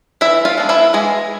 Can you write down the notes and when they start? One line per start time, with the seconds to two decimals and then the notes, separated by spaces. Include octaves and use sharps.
0.21 E3 E4 E5
0.45 F4 F5
0.57 G#3 B3 D4
0.69 E4 E5
0.93 E3 G#3 G#4